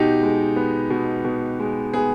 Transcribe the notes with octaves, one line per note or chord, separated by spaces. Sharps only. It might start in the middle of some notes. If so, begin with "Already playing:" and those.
Already playing: B2 D#4 G4
G#3
B3
B2
B2
G#3
B3 G#4